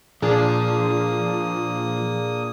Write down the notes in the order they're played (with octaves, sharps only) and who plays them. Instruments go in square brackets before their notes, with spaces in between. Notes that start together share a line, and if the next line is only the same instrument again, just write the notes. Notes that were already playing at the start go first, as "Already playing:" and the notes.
[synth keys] A#2 D4 G#4 [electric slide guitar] F3 [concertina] A#3 D#6